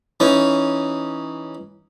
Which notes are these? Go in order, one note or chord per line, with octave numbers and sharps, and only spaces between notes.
E3 C#4 D#4